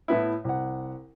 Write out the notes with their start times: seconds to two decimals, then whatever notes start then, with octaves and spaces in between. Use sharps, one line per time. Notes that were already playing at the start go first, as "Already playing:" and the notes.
0.08 A2 B3 E4
0.45 C2 F#5